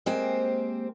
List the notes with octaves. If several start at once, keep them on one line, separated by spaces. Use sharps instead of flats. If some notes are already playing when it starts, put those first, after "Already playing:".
G#3 A#3 C4 G4 C5 G#5